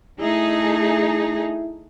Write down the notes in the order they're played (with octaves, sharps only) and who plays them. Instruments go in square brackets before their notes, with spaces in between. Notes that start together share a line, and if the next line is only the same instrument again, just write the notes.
[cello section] A3 D#4 G#4 [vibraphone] E4 E5